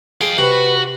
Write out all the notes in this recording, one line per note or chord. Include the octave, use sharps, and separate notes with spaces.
G#4 F5 G5
C3 F#4 B4